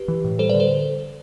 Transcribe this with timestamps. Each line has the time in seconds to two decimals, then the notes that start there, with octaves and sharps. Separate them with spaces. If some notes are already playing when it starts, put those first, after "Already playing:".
Already playing: G4 B4
0.08 E3
0.24 A2
0.39 G3 A4 C5
0.49 D3 B4 D5
0.60 A4 C5